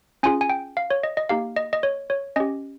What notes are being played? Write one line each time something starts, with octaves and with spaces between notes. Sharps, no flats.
C#4 F4 G#4 G#5
G#5
G5
F5
C#5
D#5
D#5
A#3 D#4 G4 F5
D#5
D#5
C#5
C#5
C#4 G4 D#5